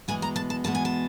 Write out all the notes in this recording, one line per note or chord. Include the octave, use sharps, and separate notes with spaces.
E2 B2 G#3 B3 G#5
A#5
A5
A5
E2 B2 G#3 B3 A5
G#5
A5